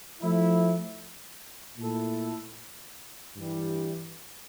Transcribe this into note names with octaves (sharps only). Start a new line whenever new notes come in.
F3 A3 E4
A#2 A3 E4 A4
G2 E3 G3